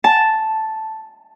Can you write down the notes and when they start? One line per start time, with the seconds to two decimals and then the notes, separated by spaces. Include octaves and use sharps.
0.04 A5